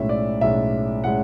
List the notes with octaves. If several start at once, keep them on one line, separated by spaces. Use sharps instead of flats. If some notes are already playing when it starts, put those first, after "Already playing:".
Already playing: B1 A2 G#3 C#4 E5
D5
B1 A2 G#3 C#4 E5
A2 G#3 C#4 F#5